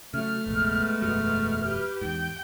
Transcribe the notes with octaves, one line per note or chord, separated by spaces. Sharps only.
C#3 F#3 A3 F6
F1 A#1 G#3 B3
E1 F#2 F#3 F6
G4 B4
E2 G#2 G5